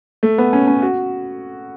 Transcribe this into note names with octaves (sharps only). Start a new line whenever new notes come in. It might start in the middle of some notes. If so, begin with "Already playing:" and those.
A3
B3
C#4
C#4
F#4